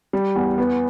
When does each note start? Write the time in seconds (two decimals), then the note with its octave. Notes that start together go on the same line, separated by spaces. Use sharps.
0.13 G3
0.36 E2
0.58 B3